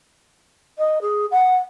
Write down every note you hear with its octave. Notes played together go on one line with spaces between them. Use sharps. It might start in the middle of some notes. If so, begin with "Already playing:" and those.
D#5
G#4
F#5